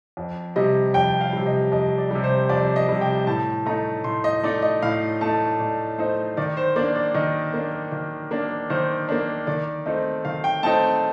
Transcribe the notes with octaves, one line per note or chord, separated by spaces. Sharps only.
F2
C3 G3 D#5
F2 G5
F5
C3 G3
D#5
F2 D#5
D5
C3 G3
C5
F2 D5
D#5
C3 G3
G5
A2 A5
A3 D#4 A#5
A2 C6
D#5
A3 D#4 D5
D#5
A2 F5
A3 D#4 A5
A2 D5
A3 D#4 C5
D#3 D5
C5
A#3 D4 D5
D5
D#3 D#5
A#3 D4
D#3
A#3 D4
D#3 C5
A#3 D4
D#3 D5
A3 C4 D#4 D#5
D#3 F5
G5
A3 C4 D#4 A5